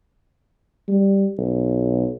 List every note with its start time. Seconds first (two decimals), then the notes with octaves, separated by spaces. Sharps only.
0.88 G3
1.38 B1